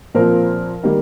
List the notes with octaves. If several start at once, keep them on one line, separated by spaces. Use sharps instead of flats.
A#2 F3 C4 A#4
D#3 G3 A#3